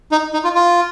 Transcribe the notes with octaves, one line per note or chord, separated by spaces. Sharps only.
D#4
D#4
F4
F4